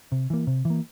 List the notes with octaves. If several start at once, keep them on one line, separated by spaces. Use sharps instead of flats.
C3
E3 A#3
C3
E3
A#3